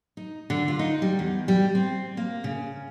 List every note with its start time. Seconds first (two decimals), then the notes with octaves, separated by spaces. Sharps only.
0.17 D#4
0.50 D3
0.68 F4
0.79 D#4
1.02 G3
1.19 E2
1.48 G3
1.75 C4
2.17 A#3
2.44 C#3